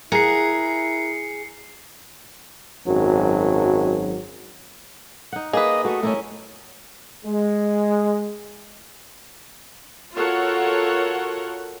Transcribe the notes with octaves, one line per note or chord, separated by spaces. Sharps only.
E4 G#4 A#4 F#5 C7 C#7
G#1 F#2 F#3
D#4 F#5
A#3 G#4 B4 D#5
A3 F#4 D#5
A3 C#4 E4 A#4
G#3
F4 F#4 A4 A#4 C#5 F#5